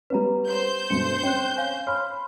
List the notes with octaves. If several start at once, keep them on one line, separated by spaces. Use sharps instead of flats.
G3 B3 C#4 B4 A#5
C5 G6
D2 G2 B2 C#7
C4 C#4 G5 F#6
F5 G#5
C#5 B5 C6 F6